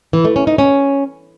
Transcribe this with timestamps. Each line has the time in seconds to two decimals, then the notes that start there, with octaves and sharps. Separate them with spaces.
0.13 E3
0.25 A3
0.36 C#4
0.47 D#4
0.58 C#4